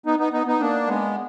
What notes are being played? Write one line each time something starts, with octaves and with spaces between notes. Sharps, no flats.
B3 D#4
B3 D#4
B3 D#4
B3 D#4
A#3 D4
G#3 B3